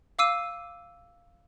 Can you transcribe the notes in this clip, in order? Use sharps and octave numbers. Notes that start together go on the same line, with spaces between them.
F5 D6 E6 C7 D#7